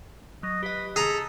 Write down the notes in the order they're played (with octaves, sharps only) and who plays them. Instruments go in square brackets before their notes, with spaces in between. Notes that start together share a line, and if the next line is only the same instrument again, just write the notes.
[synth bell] F#3 [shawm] D#5
[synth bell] G4 D#5 [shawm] B4
[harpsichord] G#4 A#5 [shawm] A4